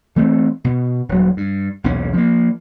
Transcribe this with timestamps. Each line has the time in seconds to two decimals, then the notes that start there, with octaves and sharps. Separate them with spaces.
0.16 E3 A3 C4
0.64 B2
1.09 D#1 F#3
1.37 G2
1.84 B1 E2 A#2 C#4
2.13 F3 A#3